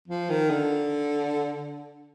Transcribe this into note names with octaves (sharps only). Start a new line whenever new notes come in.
F3
D#3
D3